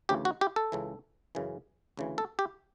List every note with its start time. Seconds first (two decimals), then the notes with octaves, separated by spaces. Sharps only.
0.09 D2 C#3 E3 G4
0.25 F#4
0.41 G4
0.56 A4
0.72 C#2 C#3 E3
1.35 F#2 C#3 E3
1.97 D2 C#3 E3
2.18 A4
2.39 G4